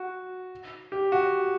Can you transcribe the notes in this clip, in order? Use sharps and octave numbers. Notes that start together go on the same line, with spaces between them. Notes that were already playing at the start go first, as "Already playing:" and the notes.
Already playing: F#4
G4
F#4